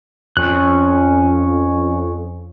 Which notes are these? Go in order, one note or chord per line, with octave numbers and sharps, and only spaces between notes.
F2 C#4 F#6